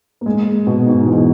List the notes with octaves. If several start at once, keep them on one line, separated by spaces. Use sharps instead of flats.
A#3
G#3
B2
G#2
E2